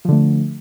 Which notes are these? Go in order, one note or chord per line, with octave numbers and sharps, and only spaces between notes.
D3 F3 A3